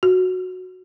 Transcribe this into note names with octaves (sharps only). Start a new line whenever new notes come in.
F#4